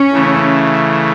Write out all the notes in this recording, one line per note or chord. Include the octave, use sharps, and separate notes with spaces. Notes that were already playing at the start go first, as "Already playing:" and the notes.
Already playing: C#4
C#3 E3 A3